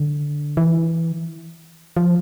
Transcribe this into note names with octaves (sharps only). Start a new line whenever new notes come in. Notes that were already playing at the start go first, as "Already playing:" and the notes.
Already playing: D3
E3
F3